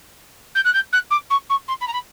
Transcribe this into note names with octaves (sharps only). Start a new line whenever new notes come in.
G6
F#6
G6
F#6
D6
C#6
C#6
C6
B5
A#5
B5